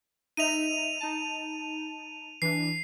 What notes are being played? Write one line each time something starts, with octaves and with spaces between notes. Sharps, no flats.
D#4 D#5 E5 D#7 F7
D#4 A5
E3 D4 C7